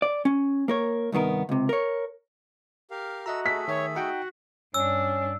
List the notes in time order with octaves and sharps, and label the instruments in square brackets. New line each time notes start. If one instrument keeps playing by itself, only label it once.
[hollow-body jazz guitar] D5
C#4
A#3 A#4 C#5
C2 G2 D#3 B3 A#4
C#2 C3
A#4 C#5
[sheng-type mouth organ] G4 A#4 F5
[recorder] F#4 [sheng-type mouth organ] A4 E6 [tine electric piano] D#5 E5 A#5
[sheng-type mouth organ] A3 G#4 A4 [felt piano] B6
[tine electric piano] D#3 E5 [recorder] C#5
[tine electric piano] D#4 F#5 G5 [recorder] F#4
[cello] G2 D4 [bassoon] C#4 [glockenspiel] E6